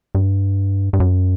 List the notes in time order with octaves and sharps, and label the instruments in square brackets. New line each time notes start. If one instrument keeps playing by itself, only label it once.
[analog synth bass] G2
G2
F#2